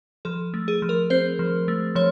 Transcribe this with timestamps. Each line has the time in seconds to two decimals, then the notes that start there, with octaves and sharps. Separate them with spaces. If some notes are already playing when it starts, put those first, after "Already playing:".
0.25 F3 A4
0.54 A3
0.68 G#4
0.82 F3
0.89 A#4
1.10 C4 C5
1.39 F3
1.68 A3
1.95 F3 C#5